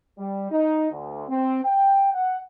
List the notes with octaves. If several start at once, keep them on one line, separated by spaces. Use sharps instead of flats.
G3
D#4
D2
C4
G5
F#5